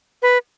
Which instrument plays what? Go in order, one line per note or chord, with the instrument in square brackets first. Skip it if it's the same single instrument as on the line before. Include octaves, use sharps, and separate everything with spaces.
[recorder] B4